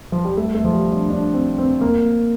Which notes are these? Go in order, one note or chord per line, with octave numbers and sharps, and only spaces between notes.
F3
G3
A3
A3
F3
G3
D4
D4
C4
C4
A#3